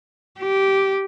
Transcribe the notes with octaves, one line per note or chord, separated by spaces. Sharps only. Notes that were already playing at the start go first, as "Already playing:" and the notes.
G4